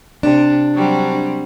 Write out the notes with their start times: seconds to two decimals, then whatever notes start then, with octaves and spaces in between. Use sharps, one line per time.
0.23 C3 D4
0.74 F#3 G3 C4